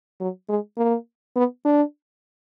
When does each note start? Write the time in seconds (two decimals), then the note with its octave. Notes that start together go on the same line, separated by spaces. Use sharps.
0.20 F#3
0.49 G#3
0.78 A#3
1.36 B3
1.65 D4